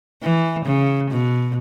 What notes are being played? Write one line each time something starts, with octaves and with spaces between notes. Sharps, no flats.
E3
C#3
B2